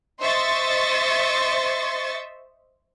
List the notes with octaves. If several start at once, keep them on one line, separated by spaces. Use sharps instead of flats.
C5 D#5 E5 C6 C#6 A6